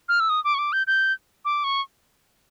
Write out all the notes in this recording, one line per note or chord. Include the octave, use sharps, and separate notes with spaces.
F6
E6
D#6
D6
C#6
D6
G6
G6
D6
C#6